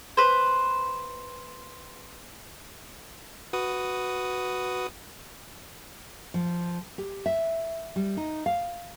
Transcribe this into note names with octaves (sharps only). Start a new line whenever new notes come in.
B4 C5
F#4 B4 D#6
F3
G4
E5
G3
D#4
F5